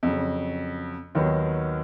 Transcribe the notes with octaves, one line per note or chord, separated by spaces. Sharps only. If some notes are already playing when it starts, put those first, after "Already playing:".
F2 C#3 F#3
D#2 D#3 F#3 B3